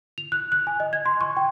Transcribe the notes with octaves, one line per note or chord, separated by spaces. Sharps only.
F7
F#6
F#6
G#5
D#5
G#6
C6
C#6
G5